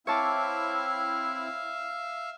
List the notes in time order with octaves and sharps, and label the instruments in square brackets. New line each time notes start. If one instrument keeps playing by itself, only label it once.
[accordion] C4 E4 [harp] C#5 A5 D6 [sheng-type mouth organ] E5 F5